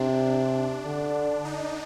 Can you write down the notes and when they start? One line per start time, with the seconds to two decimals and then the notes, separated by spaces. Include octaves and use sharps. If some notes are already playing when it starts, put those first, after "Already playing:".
Already playing: C3 D4
0.86 D3
1.45 D#4